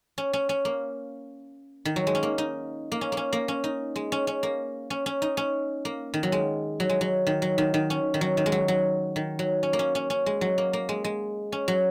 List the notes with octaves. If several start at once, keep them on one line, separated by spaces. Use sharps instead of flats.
C#4
C#4
C#4
A#3
D#3
F#3
G#3
C#4
A#3
D#4
A#3
C#4
A#3
C#4
A#3
C#4
D#4
G#3
C#4
C#4
A#3
C#4
C#4
D#4
C#4
A#3
D#3
F#3
G#3
F#3
G#3
F#3
D#3
F#3
D#3
D#3
C#4
D#3
F#3
D#3
G#3
F#3
F#3
D#3
F#3
C#4
A#3
C#4
C#4
C#4
G#3
F#3
A#3
A#3
G#3
G#3
C#4
F#3